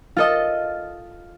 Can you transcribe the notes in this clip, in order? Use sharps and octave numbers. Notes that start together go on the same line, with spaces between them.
F4 A4 D#5